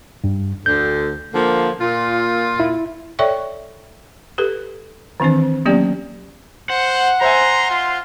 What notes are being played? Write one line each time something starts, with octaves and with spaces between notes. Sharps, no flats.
G2
D2 D3 G6
D3 F3 A#3
A#2 F4
E4
A4 C#5 D5 E5 G5 C#6
G4 A4 B4
D#3 E3 C4 D4 C5
F#3 A#3 B3 C#4 G4 D5
C5 F#5
C5 E5 G#5 A#5 C6
F4